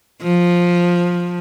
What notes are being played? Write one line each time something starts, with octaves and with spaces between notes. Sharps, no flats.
F3